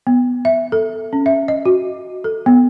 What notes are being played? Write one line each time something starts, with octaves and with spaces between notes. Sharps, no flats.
B3
E5
A4
C#4
E5
D#5
F#4
A4
B3